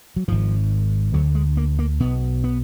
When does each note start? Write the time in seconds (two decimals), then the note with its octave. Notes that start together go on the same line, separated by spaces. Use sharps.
0.16 F#3
0.28 G#1 G#2 F3
1.14 D2 D3 F#3
1.35 G#3
1.57 A#3
1.79 A#3
2.00 B1 B2 B3
2.44 B3